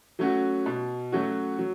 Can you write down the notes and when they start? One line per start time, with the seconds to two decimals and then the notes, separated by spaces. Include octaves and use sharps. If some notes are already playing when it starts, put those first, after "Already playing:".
0.19 F#3 A3 C#4 F#4
0.66 B2
1.12 F#3 A3 C#4 F#4
1.59 F#3